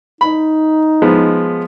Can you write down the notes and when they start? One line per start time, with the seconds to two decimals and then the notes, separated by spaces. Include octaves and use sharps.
0.21 D#4 B5
1.02 F3 G#3 B3